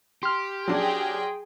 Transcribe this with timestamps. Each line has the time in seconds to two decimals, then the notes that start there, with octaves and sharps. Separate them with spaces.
0.23 G4 C6 F6
0.68 F#3 D4 G#4 G5